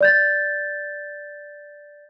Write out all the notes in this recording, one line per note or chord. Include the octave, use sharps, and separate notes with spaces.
D5 G6 A6